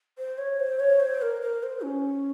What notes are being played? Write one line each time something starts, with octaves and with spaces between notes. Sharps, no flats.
C5
C#5
C5
C#5
C5
A#4
A#4
C5
C#4